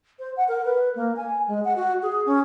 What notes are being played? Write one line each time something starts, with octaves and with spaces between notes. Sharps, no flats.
C5
F#5
A#4
B4
A#3
G#5
G#3
F#5
F#4
G#4
C#4